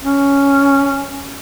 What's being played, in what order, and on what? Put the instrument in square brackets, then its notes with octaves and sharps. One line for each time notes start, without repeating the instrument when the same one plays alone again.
[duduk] C#4